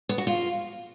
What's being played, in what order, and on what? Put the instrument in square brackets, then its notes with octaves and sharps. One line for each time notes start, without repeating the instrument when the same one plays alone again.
[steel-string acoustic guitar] B3
F#4
F4